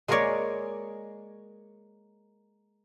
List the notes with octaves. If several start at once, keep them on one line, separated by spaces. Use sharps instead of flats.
G#3 A#3 G#4 A#4 C#5 D5